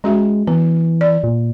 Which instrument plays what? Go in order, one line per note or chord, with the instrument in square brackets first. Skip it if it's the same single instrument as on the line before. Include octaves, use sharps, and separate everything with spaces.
[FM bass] G#3 [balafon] C#4 F#4 E5
[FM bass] E3 [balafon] B3
[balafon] D5
[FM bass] A#2